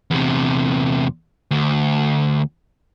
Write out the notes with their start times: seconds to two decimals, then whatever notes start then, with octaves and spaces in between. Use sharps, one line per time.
0.11 E2 C3
1.51 D2